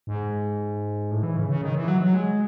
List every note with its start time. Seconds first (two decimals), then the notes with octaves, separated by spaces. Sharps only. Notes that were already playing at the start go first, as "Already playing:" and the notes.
0.07 G#2
1.11 A2
1.23 E3
1.36 C#3
1.49 C#3
1.62 D#3
1.75 E3
1.88 F#3
2.01 F#3
2.14 G#3